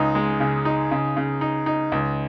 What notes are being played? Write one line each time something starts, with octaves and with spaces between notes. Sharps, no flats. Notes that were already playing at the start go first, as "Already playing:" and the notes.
Already playing: C#2 D#4
G#3
C#3
D#4
C#3
C#3
D#4
D#4
C#2